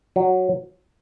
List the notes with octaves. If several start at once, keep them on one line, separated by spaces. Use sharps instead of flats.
F#3